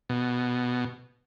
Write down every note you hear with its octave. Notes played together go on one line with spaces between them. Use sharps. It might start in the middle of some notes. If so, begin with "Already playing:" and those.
B2